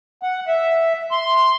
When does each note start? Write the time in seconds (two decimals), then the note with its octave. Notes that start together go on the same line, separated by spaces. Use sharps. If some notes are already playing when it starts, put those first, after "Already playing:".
0.23 F#5
0.47 E5
1.11 C6